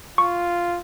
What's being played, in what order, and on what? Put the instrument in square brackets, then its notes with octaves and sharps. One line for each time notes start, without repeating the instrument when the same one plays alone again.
[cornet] F4 [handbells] C#6